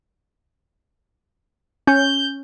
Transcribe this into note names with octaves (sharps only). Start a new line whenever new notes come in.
C#4 G6